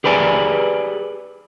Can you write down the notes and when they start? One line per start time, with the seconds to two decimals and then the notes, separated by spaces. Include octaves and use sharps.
0.04 G4 G#4 B4 D5 G#5